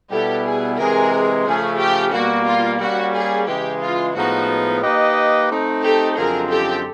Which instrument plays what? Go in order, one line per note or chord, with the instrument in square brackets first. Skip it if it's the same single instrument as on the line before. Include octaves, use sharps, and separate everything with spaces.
[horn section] B2 G3 B3 E4 [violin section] G4 A4
[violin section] G#4
[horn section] C3 E3 G#3 [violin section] G#4 A#4
[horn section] C#3 F3 A3 C#4 [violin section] G#4
[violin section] G4
[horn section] B2 G3 A#3 [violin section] F#4
[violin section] F4
[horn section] G3 A#3 C#4 [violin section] F#4
[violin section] G#4
[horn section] C#3 E3 G#3 [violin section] G4
[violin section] F4
[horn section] A2 F3 G#3 B3 D#4 [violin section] F#4
[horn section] A#3 D#4 G4 B4 D#5
A3 C4 D#4
[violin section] G4 A4
[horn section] F#2 D3 F3 G#3 C4 [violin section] G#4 A#4
[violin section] G4 A4